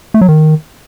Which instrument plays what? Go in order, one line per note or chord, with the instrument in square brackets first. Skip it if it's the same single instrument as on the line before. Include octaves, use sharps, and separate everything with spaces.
[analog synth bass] A3
F#3
D#3